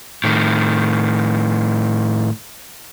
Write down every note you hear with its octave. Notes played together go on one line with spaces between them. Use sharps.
A2 D#3